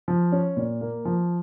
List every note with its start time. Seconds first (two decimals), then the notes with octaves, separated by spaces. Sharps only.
0.08 F3
0.32 C#4
0.57 A#2
0.81 A#3
1.05 F3